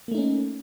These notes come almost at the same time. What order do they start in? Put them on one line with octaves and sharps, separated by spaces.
A#3 A3 D#4 C#4